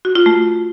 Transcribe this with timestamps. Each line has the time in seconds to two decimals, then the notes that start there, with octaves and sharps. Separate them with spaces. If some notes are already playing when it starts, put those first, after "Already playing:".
0.05 F#4
0.15 F4
0.26 A3